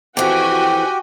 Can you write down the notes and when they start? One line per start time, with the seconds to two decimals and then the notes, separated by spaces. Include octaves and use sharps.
0.17 F2 E3 F#4 G4 G5 G#5